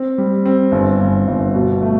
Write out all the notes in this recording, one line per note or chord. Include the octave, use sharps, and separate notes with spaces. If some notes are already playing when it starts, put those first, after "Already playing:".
Already playing: C4
G3
C4
G1
G1
G1
B2
A3